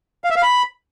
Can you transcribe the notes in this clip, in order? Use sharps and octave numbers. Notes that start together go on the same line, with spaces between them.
F5
E5
F5
B5